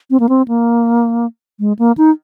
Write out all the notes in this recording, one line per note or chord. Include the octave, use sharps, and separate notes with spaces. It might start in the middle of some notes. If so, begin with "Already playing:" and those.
C4
A#3
C4
A#3
G#3
A#3
D#4